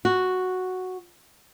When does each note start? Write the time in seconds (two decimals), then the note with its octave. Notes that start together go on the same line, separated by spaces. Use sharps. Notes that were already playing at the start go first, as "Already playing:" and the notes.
0.05 F#4